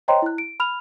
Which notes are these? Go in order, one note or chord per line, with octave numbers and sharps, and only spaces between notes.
C5 C#5 D#5 G5 A#5 C6
E4 F#6
D7
B5 F6 F7